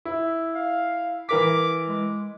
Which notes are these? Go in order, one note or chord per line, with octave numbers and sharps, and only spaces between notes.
E4
F5
E3 A#4 D6 B6
G#3